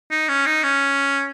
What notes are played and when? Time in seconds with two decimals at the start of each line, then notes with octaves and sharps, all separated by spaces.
0.11 D#4
0.29 C#4
0.46 D#4
0.64 C#4